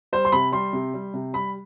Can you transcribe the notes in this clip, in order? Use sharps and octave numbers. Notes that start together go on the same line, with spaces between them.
G3 C5
C6
C3 B5
G3 C6
C3
G3
C3
G3 B5